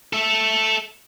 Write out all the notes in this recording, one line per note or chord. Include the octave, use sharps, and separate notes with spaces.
A4 E5